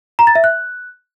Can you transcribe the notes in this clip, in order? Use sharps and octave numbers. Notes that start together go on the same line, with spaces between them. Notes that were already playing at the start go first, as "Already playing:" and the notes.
A#5
A6
E5
F#6